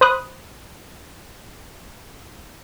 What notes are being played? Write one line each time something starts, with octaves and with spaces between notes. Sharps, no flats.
C5 B5 D#6 F#6